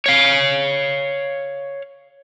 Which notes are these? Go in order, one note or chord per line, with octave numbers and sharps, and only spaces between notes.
C#5 F5